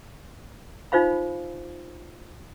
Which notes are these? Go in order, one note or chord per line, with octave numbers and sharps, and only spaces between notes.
D#4 F4 C5 F5 B5